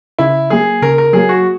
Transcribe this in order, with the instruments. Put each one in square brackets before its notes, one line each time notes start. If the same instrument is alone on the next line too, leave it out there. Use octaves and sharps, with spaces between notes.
[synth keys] C#3 [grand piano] E4
[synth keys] F#3 A#3 [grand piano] G#4
[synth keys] C#3 [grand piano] A#4
[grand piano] A#4
[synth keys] F#3 A#3 [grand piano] G#4
[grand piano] F#4